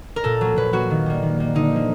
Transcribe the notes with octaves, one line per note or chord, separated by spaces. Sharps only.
A#4
A#2 A4
F#3 A#3
A#2 B4
F#3 A#3 F#4
D#3
G3 A#3
D#3
G3 A#3
D3 D#4
F3 A#3